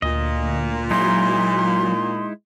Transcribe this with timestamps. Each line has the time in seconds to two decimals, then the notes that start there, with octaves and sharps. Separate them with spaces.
0.02 D2 A#2 D#5
0.91 F#3 G#3 D#4 E4 C6